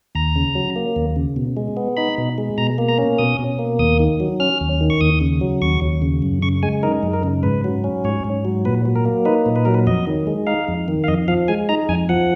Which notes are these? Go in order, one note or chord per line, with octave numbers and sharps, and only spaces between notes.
D#2 A#5
C#3
F#3
A#3
D#2
C#3
B2
G#3
B3
D#4 B5
B2
G#3
B2 A#5
A#3
A#5
C#4
B2 D#6
B2
A#3
D#2 D#6
D#3
F#3
C#4 F6
D#2
D#3
C#6
D#2 D#6
C#3
F#3
D#2 C#6
D#2
C#3
F#2
C#3 C#6
G#3 G#5
D#4 A#4
F#2
A#4
C#3
G#2 B4
F#3
C#4
G#2 C#5
G#2
F#3
A#2 B4
F#3
A#4
A#3
D#4 B4
A#2
B4
F#3 A#4
B4
F2 D#5
D#3
G#3
D#4 F5
F2
D#3
F5
F2 D#5
F3 F5
G#3 G#5
D#4 A#5
F2 G#5
F3 F#5